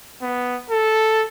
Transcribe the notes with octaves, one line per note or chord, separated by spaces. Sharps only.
B3
A4